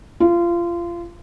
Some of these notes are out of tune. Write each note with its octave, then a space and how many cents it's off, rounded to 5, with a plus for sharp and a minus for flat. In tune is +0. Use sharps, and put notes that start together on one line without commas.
F4 -25